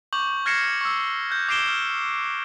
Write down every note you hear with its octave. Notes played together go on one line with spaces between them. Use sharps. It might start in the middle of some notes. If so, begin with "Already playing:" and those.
C#6 D6 G6 F#7
F6 G#6 A#6 C7 C#7 E7
C#6 E6
F#6 G6
D6 G#6 C7 D7 E7 G7
F6